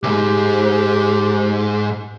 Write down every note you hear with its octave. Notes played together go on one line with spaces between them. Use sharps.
C2 G#2 G4